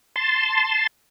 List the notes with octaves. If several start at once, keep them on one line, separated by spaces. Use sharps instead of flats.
A5 C6